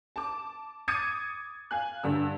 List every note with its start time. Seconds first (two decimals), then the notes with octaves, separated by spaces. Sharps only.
0.16 A5 D6
0.88 D6 D#6 G#6 A6 C#7 D#7
1.71 F5 G#5 F#6
2.04 G2 D3 E6